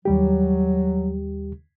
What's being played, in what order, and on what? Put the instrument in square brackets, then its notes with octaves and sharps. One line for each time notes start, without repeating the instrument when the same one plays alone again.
[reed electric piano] D#2 G3 G4 [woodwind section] F#3